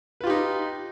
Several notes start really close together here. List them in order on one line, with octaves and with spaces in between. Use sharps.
B4 F4 G4 D#4